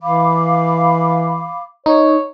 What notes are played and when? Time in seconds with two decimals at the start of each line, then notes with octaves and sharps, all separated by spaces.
0.02 E3 F5 B5 D6
1.86 D#4 C#5